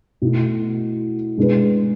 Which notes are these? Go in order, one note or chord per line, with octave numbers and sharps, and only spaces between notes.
B2 A3 E4
B2 G#3 D4 G#4 B4